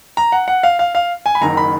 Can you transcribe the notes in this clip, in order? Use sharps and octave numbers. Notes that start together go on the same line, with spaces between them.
A#5
F#5
F#5
F5
F5
F5
G#5
B5
F#1 F#2 D#3 A#5
B5